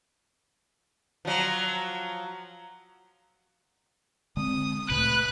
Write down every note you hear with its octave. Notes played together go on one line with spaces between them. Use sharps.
F3 F#3
D3 G#3 C4 D#6
D2 A#2 C#3 A3 B4 F#6